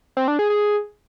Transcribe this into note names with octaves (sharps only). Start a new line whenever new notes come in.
C4
D4
G#4
G#4